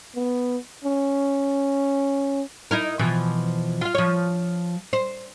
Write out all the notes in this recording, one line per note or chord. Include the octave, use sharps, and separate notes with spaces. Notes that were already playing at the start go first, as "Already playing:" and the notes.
B3
C#4
D#4 E4 A#4
B2 E3 F3
F4 F5
F3 C#5
C5